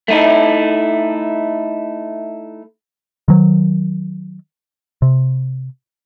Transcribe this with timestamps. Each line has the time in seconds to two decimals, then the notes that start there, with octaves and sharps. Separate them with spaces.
0.08 A3 D#4 E4
3.28 D#3 F#3
5.02 C3